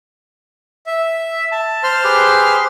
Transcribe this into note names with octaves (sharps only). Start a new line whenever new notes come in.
E5
A5
C5 C6 F6
G4 G#4 B4